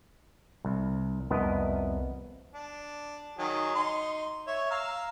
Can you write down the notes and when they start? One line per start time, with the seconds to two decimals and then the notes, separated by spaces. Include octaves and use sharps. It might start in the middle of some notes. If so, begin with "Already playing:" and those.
0.65 C2
1.31 C2 F2 B3 A#4 D#5
2.54 D4
3.38 D#3 F#3 G#4
3.75 D#4 C6
4.47 C#5 E5
4.71 F5 A#5 E6